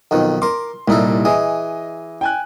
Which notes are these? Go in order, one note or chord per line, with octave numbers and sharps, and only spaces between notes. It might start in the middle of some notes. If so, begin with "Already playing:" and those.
B1 F2 D#3
A#4 C6 D6
C2 A#2 G3 D#4 E4 A4
E3 G#4 D#5
G5 G#5 F#6